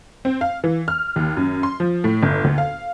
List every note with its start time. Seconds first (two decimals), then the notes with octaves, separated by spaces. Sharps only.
0.25 C4
0.41 F5
0.64 E3
0.88 F6
1.16 D#2
1.37 F#2
1.63 C6
1.80 F3
2.04 A2
2.23 G1
2.44 D2
2.58 F5